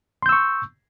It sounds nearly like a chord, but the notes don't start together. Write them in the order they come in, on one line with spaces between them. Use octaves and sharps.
C6 G6 E6 C#6